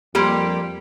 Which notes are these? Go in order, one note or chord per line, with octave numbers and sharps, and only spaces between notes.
F2 G3 A#3 G4 B5 C6